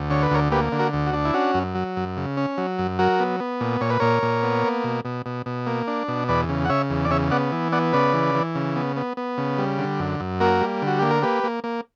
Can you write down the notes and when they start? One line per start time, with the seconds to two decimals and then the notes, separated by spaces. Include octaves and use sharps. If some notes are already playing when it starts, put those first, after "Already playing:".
Already playing: D2
0.11 D3 C#5
0.23 B4
0.31 D2 A#4 C#5
0.52 A#3 G4 B4
0.72 D3
0.79 F#4 A#4
0.93 D2
1.06 F#4
1.13 D4
1.25 E4
1.34 C#4 F#4
1.54 F#2
1.75 F#3
1.96 F#2
2.17 C#3
2.37 C#4
2.58 F#3
2.79 F#2
2.99 F#3 F#4 A#4
3.20 B3
3.40 B3
3.61 A#2
3.81 A#2 C#5
3.90 B4
4.00 A#2 A#4 C#5
4.23 A#2
4.43 B3
4.64 A#3
4.84 B2
5.05 B2
5.26 B2
5.46 B2
5.67 A#3
5.88 D4
6.08 B2
6.28 E2 B4 D5
6.49 C#3
6.65 F#5
6.69 C#3 C#5 E5
6.90 E2
7.05 D5
7.11 C#3 C#5 E5
7.31 B3 D5 F#5
7.52 E3
7.72 B3 D5 F#5
7.93 C#3 B4 D5
8.14 E3
8.35 E3
8.55 C#3
8.76 B3
8.96 B3
9.17 B3
9.38 C#3
9.58 G3
9.79 D3
9.99 F#2
10.20 F#2
10.41 A#3 F#4 A#4
10.61 G3
10.82 D3
10.87 F#4
10.99 A#3 G4
11.11 A#4
11.23 A#3 G4 B4
11.44 A#3
11.64 A#3